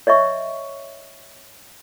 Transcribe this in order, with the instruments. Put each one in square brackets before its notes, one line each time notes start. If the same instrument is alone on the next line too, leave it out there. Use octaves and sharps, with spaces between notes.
[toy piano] C#5 D#5 E5 C#6